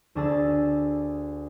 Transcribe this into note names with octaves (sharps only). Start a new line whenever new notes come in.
D2 D4 G#4 A5 E6